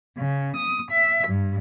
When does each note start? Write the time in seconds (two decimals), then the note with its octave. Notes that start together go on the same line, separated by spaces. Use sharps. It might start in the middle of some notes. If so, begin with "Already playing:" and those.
0.17 C#3
0.55 D#6
0.91 E5
1.26 G2